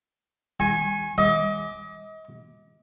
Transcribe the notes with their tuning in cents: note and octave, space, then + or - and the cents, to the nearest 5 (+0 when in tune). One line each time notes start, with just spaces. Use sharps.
G#5 +5 C#6 -30
D#5 +35 D6 +0